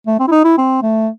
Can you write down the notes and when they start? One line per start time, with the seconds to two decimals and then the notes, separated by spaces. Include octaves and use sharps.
0.07 A3
0.20 C4
0.28 E4
0.32 D#4
0.45 E4
0.58 C4
0.82 A3